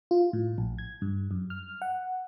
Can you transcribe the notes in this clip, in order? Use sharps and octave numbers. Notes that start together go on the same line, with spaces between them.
F4
A2
A#1
G#6
G2
F#2
F6
F#5